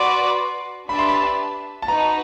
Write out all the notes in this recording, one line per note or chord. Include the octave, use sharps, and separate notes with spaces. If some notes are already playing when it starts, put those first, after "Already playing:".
Already playing: F#4 B4 D5 C6
D4 G4 B4 E5 A5 B5
C6
B5
A5
D#4 F#4 B4 A#5